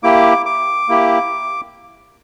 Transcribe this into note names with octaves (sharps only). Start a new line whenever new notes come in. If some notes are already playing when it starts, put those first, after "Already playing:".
A#3 E4 G4 D6
D6
A#3 E4 G4